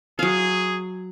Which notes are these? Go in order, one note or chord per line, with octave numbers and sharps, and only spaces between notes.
F#3 G#4 F5